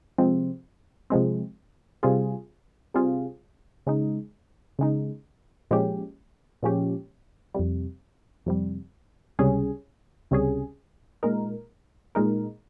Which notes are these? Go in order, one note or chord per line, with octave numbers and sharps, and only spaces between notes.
C3 F3 G#3 C4
C3 F3 G#3 C4
C3 G3 C4 F4 G#4
C3 G3 C4 F4 G#4
C#3 G#3 D#4
C#3 G#3 D#4
A#2 F3 G#3 C#4 G4
A#2 F3 G#3 C#4 G4
F2 C3 G3
F2 C3 G3
C#2 C3 G3 C#4 G#4
C#2 C3 G3 C#4 G#4
A#2 G#3 D#4 A#4
A#2 G#3 D#4 A#4